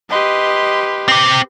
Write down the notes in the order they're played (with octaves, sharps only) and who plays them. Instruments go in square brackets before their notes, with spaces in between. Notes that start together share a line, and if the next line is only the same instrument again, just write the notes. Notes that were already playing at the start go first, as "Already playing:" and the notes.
[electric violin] G4 B4 [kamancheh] D#5 C6
[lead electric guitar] C4 G4